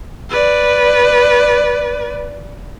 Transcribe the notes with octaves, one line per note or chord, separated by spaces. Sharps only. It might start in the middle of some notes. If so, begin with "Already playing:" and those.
B4 D5